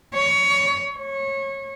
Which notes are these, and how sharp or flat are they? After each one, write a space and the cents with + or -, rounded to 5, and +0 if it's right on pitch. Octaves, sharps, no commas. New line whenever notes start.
C#5 +20
C#5 -25